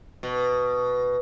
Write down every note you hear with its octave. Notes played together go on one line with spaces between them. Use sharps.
B2